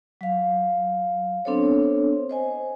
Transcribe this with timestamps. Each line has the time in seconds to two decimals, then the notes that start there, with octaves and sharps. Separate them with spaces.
0.21 F#3 F5
1.45 B3 C4 D4 A4 C5 C#5
2.29 C5 D#5 G#5